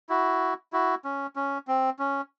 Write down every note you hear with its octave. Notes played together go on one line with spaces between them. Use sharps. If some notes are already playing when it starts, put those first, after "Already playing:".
E4 F#4
E4 F#4
C#4
C#4
C4
C#4